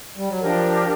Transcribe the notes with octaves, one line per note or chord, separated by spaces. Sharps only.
G3
F#3
F3 D4 G4 A#4